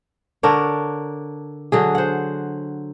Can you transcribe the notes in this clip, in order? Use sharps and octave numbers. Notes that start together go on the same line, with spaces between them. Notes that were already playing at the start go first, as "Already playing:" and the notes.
D3 D4 A#4 C#5
D3 F#3 G#4
C5 F#5